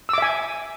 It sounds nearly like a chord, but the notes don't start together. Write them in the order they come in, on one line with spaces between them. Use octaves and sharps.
E6 D6 E5 G#5